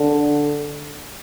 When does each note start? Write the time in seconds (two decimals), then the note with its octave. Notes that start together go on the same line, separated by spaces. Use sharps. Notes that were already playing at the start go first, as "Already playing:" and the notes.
Already playing: D3